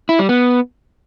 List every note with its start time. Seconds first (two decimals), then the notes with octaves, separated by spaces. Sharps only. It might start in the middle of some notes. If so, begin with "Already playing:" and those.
0.09 E4
0.19 G3
0.29 B3